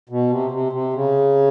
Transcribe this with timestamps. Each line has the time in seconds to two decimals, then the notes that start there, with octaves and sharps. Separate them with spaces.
0.09 B2
0.30 C3
0.51 C3
0.72 C3
0.93 C#3